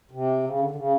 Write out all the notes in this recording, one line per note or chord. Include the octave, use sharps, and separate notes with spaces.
C3
C#3
D3
D3
C#3